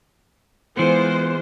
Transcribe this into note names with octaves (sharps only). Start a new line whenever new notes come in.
E3 G#3 B3 F4 C5